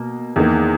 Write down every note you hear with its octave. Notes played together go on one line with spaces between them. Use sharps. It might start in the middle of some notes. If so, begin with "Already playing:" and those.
Already playing: B2 A#3
E2 D#3 A#3